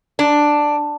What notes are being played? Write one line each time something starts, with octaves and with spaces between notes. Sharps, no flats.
D4